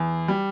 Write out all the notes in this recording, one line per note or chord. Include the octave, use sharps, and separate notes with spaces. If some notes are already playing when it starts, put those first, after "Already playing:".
Already playing: E2
G3